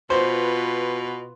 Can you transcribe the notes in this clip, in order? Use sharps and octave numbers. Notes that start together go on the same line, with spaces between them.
B2 F4 B4 C5